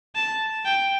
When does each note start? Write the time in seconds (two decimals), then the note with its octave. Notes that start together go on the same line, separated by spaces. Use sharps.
0.15 A5
0.65 G5